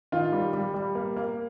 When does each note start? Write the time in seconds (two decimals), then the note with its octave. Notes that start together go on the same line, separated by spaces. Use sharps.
0.12 D#3 F4
0.32 G3
0.53 G3
0.74 G3
0.95 A#3
1.16 A#3